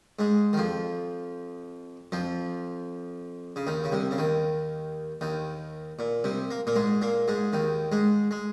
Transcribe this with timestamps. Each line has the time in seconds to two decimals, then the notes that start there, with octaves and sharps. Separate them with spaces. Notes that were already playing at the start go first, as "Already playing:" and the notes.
0.19 G#2 G#3
0.53 D#3
0.57 F2 F3
2.12 F2 F3
3.56 C#3
3.67 D#2 D#3
3.84 C#3
3.92 C2 C3
4.11 C#3
4.18 D#2 D#3
5.21 D#2 D#3
5.99 A#2
6.24 C2 C3
6.51 A#3
6.67 A#2 A#3
6.76 G#2 G#3
7.02 A#2 A#3
7.28 G#2 G#3
7.53 D#2 D#3
7.92 G#2 G#3
8.31 G#3